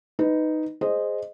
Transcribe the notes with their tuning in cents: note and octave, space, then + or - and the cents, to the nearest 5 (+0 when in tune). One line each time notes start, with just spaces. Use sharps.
D#4 +0 B4 +10 D#5 +0
G#4 +0 C5 +0 D#5 -10